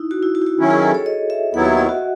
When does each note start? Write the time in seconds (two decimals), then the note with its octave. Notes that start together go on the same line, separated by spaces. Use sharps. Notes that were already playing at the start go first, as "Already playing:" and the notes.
Already playing: D#4 E4
0.11 F#4
0.23 E4
0.35 F#4
0.42 E4
0.46 F#4
0.59 D#3 F#3 C#4 E4
0.71 G#4
0.82 A4
0.94 C#5
1.06 D#5
1.30 E5
1.54 D#2 D#3 F#3 B3 E4 F#5
1.65 E5
1.77 D#5
1.89 F#4